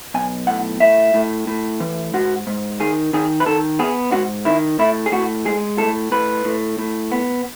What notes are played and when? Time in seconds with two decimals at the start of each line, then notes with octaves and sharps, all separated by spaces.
0.14 B1 G#5
0.47 A2 F#5
0.80 A2 E5
1.14 A2
1.47 A2
1.80 E3
2.14 G#2 F#4
2.47 G#2
2.80 D#3 G#4
3.13 D#3 G#4
3.40 B4
3.46 D#3 A4
3.79 B3 G#4
4.12 G#2 F#4
4.45 D#3 E4
4.79 A2 E4
5.06 G#4
5.12 A2 F#4
5.45 G#3 G#4
5.78 A2 A4
6.12 A2 B4
6.45 A2
6.79 A2
7.12 B3